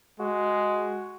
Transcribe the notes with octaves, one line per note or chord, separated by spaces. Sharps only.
G#3 F#4